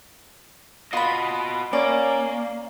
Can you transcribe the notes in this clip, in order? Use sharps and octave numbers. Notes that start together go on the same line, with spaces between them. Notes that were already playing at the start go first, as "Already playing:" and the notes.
F4 F#4 D#5 B5
A#3 C#4 D5